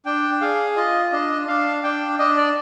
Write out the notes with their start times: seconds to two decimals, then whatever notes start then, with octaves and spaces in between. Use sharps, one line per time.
0.06 D4 G5
0.41 G#4 F5
0.76 F4 D#5
1.12 D4 D#5
1.47 D4 F5
1.83 D4 G5
2.19 D4 D#5
2.37 D5